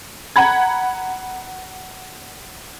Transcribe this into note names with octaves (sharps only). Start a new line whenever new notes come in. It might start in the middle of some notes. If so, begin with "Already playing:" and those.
F#5 A#5 B5 G#6